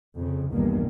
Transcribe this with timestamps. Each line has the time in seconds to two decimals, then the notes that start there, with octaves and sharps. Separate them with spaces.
0.17 F2 C#3
0.52 B1 E2 G2 A#2 D#3 A#3